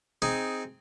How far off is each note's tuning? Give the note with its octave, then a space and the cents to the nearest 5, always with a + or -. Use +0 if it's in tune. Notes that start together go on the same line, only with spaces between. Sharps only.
C4 +0 D#4 +5 G#4 +0